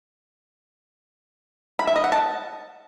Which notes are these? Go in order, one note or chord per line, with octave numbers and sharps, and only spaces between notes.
B5
E5
D#5
F#5
A5